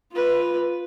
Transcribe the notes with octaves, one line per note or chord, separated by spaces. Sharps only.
F4 B4